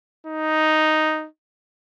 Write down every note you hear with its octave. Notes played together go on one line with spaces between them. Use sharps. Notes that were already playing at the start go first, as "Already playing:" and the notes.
D#4